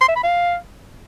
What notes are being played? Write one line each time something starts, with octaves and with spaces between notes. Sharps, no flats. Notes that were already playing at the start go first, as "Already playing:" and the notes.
C6
E5
B5
F5